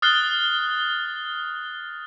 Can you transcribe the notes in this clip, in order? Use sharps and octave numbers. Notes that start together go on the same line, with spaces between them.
D#6 F6 F#6 A6 C7 G7